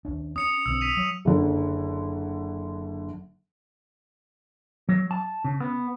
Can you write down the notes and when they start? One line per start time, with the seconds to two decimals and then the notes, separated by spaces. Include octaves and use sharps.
0.05 D#2 C#4 D4
0.36 C#4 D#6 C#7 F7
0.66 B1 D3 C4 E6
0.81 B6 D#7 F7
0.97 F#3
1.25 F#1 D3
4.89 F#3
5.11 A5
5.44 C#3
5.60 B3